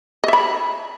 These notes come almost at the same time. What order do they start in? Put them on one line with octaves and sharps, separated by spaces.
D#5 E5 B5